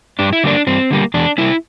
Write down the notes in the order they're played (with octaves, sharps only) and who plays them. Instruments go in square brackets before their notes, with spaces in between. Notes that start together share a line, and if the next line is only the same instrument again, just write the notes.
[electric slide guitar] G2 D4
E4
D3 G3 A#3 D4
G2 C4
D3 G3 A#3
E2 D4
C3 G3 A#3 E4